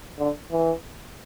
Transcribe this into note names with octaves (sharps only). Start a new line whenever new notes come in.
D3
E3